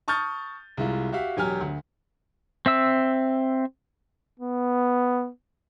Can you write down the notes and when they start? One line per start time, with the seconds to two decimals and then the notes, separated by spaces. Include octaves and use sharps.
0.08 A5 C#6 D#6 F6 G6 A6
0.77 C2 G#3 E4 F4
1.12 F#4 G4 E5 F5
1.37 E1 F#3 G4 G#5 F6
1.61 D2
2.66 C4 E5 E6
4.40 B3